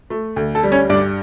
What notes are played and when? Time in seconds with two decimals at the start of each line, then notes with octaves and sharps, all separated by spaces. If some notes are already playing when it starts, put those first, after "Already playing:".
0.10 A3
0.36 D2
0.55 A4
0.63 G3
0.72 C#4 C#5
0.90 G2 D4 D5